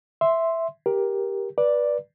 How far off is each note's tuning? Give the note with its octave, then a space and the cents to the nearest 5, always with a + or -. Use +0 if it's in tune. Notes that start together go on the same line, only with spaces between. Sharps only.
E5 +0 C6 +0
G4 +5 A#4 +15
B4 -20 D5 +0